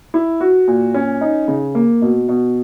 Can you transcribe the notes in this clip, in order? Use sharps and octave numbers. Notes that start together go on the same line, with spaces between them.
E4
F#4
A#2
C#4
D#4
C#3
A#3
B2
B2